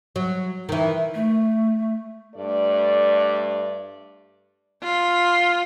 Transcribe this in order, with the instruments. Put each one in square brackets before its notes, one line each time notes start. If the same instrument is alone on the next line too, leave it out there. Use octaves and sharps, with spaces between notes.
[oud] F#3
D#3 E3
[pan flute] A3
[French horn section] G2 A3 D5
[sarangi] F4